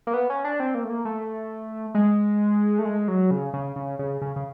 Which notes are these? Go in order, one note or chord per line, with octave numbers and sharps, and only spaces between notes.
A#3
B3
C#4
D4
C4
A#3
A3
A#3
A3
G#3
A3
G#3
F#3
C#3
C#3
C#3
C#3
C#3
C#3